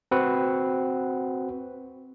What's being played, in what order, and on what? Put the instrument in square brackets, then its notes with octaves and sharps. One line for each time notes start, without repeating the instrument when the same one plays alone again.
[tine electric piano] C4 F#4 B4 F#5